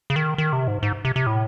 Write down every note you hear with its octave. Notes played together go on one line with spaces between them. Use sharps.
C#3
D#3
D#3
C3
G#2
G#2
C3
C3
A2